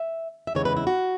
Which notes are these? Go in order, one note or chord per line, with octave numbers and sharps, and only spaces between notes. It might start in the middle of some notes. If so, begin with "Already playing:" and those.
Already playing: E5
E5
E2 C#3 E3 G#3 C#5
B4
E4
F#4